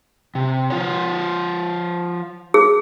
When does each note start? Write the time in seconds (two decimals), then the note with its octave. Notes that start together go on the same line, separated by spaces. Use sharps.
0.35 C3
0.70 F3 F4 C#5
2.54 G#4